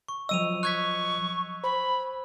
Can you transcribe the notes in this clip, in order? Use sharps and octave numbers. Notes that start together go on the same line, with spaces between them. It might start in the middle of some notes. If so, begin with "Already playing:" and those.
C#6
F3 F#3 D#5 E6 D#7 F7
C#6 F#6 G#6 B6
C5 B5